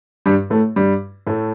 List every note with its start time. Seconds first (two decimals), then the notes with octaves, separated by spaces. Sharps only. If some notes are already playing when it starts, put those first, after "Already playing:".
0.26 G2 G3
0.50 A2 A3
0.76 G2 G3
1.27 A2 A3